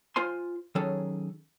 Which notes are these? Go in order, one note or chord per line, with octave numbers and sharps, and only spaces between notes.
F4 C5 G#5 C6
D#3 F#3 C#4 G#4 A4